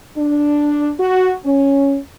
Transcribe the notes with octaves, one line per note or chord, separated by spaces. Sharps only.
D4
F#4
C#4